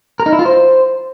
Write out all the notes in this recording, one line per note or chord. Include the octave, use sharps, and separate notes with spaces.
A#4
D#4
E4
F4
C5